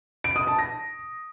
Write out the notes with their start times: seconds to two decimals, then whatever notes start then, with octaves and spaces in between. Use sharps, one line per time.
0.24 D7
0.36 D#6
0.47 A5
0.59 A#6